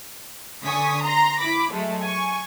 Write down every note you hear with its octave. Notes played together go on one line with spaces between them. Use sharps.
D3 G#5 C#6 D#6 B6
A#5 C6 A#6
E4 B5 D6
F#3 G#3 A3
G#5 C#6